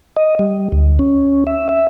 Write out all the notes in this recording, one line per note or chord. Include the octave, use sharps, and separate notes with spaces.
D#5
G3
D2
C#4
E5
E5